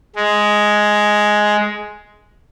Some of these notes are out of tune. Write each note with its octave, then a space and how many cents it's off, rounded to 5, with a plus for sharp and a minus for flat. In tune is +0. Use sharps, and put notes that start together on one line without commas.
G#3 +5